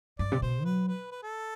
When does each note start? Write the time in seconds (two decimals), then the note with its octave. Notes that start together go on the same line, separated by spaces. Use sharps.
0.19 G2 D5
0.32 C3
0.42 B2 C5
0.65 F#3 B4
0.88 B4
1.11 B4
1.23 A4